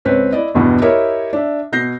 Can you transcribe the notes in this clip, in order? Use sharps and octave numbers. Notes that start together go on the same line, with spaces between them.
C#2 C4 B4 C#5
E4 D5 D#5
E2 G2 B2 E3 B3
E4 G4 A#4 C#5 D#5 E5
D4 E5
B2 G6 A#6 C7